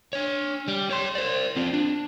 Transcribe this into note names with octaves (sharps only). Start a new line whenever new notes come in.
D4 C#5
G3
C#5 C6
C5 D5
C4 F4
D4